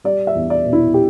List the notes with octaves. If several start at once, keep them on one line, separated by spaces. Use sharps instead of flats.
G3 D5
E5
E2
D5
B2
E4
G4